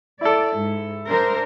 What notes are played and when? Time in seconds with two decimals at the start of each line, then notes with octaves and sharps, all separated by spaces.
0.21 E4 A4 D5
0.55 G#2
1.08 D4 A#4 C5